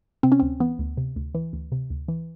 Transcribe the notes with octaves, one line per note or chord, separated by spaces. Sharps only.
C3 C4
C#4
D2 C4
E3 B3
D2
C3
D2
E3
D2
C3
D2
E3